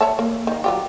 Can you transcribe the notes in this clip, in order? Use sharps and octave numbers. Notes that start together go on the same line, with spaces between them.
C#5 E5 A5
A#3
D#3 A#3
F#3 F4 G4